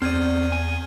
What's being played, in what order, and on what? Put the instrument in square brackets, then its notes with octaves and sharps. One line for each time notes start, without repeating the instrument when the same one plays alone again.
[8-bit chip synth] E2 [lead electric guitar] C4 D5 [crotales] F6 G#6 D#7
[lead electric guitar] G#5